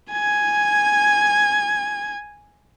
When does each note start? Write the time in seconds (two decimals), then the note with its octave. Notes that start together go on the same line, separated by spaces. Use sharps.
0.12 G#5 G#6